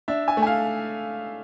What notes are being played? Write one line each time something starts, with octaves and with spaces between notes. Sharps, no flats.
D4 E5
G#5
A3
G#5
F5